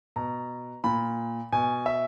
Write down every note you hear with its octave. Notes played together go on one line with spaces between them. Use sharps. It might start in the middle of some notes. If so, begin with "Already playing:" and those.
B2 A#5
A#2 B5
B2 G#5
E5